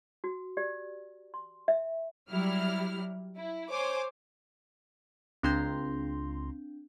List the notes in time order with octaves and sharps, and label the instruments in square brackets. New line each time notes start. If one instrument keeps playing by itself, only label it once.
[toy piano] F#4
G4 D5
C6
E5
[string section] F#3 G3 E4 F6
E4
C5 C#5 G#5 D6
[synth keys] C#2 A#5 C6 [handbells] C4 D4 G6